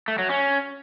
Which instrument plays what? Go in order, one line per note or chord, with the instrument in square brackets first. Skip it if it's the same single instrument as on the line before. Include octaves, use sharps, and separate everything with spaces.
[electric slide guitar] A3
F#3
C#4